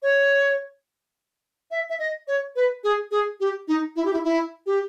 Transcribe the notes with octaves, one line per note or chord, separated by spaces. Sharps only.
C#5
E5
E5
D#5
C#5
B4
G#4
G#4
G4
D#4
E4
G4
E4
E4
G4